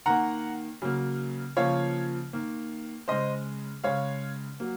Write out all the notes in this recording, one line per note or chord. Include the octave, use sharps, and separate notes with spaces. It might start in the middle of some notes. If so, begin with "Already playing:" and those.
D#3 A#3 F#5 A#5
C#3 F#3 A#3
C#3 F3 A#3 C#5 F5
D#3 A#3
C#3 G#3 C5 D#5
C#3 G#3 C#5 F5
F#3 A#3